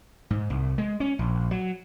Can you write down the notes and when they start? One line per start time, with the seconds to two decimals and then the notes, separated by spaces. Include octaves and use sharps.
0.30 G#2
0.50 C2
0.78 G#3
1.00 C#4
1.19 A#1
1.51 F#3